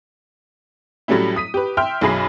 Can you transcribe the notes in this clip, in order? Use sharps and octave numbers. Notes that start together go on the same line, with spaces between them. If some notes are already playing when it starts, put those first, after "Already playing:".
A2 F#3 G3 A3 C#4 E4
D#6 B6 D#7
G4 B4
E5 G5 C6 F6
B1 F#2 F#3 G#4 B5 C7